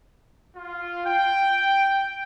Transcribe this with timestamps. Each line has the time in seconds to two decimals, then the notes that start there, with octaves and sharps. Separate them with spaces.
0.56 F4
1.05 G5